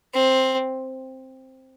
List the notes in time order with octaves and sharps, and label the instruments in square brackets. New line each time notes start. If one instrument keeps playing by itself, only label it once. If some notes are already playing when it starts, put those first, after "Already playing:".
[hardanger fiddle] C4